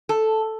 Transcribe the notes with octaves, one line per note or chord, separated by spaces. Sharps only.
A4